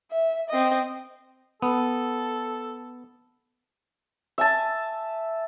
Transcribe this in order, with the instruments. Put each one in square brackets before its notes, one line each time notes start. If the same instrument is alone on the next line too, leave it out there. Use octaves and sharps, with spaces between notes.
[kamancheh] E5
C4 D#5
[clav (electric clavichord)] B3 [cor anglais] A4
[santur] E5 G#5 A5